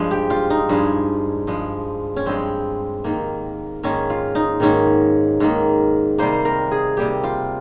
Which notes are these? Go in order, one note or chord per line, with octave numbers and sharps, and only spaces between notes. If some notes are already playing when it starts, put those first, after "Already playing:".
Already playing: G2 F3 G#3
G4
F4
D#4
G2 F3 G#3
G2 F3 G#3
C#4
G2 F3 G#3 C4
G#2 D#3 A#3
G#2 D#3 A#3 C#4
F4
D#4
G#2 D#3 A#3 C#4
G#2 D#3 A#3
C3 G3 A#3 C5
A#4
G#4
C3 G3 A#3 G4
F4